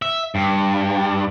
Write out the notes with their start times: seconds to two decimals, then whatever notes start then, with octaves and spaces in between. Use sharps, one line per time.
0.02 E5
0.35 G2